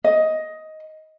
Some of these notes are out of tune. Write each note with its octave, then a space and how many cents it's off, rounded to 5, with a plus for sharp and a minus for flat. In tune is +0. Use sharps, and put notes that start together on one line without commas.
D#5 +10